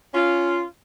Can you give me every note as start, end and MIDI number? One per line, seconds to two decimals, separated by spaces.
0.14 0.63 61
0.14 0.63 65